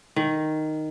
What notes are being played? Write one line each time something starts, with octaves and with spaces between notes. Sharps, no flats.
D#3